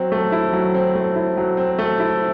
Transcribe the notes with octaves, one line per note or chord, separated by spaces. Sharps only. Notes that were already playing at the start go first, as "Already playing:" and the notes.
Already playing: F#3 C4
A3
E4
F#3
C4
A3
E4
F#3
C4
A3
E4